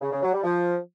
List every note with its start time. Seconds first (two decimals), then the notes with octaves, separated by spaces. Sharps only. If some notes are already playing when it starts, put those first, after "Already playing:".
0.02 C#3
0.12 C#3
0.23 F#3
0.33 G3
0.44 F3